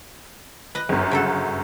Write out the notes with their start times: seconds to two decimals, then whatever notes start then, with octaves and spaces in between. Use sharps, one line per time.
0.75 B4 D#5
0.89 G1 F#2
1.11 C#3 F#3 A4